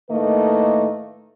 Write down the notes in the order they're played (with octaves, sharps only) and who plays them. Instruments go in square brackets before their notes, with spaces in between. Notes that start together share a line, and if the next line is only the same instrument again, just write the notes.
[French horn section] A2 D#3 A3 A#3 B4 D#5